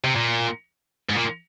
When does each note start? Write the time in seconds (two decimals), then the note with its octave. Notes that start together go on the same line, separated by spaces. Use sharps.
0.04 C3
0.15 A#2
1.09 G#2
1.15 A#2